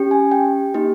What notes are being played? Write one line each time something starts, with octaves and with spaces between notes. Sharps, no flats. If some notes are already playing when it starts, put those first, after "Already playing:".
Already playing: C#4 G4
G#5
G5
A#3 D#4 G4